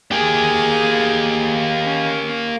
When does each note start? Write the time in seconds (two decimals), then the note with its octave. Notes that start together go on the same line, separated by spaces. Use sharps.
0.12 A#3 G4 G#4 G#5
1.85 C#4